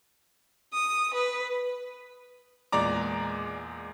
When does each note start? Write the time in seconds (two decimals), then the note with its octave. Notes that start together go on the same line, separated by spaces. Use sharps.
0.74 D#6
1.14 B4
2.72 E2 A#2 G#3 D5 A#5 D6